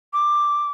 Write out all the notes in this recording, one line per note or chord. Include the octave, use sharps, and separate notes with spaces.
D6